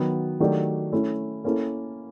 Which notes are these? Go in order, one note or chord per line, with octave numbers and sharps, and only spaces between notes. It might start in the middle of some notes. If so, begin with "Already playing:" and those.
Already playing: D#3 F#3 B3
D#3 F#3 A3 D4 G4
A3 C#4 E4
A#3 C#4 E4 A4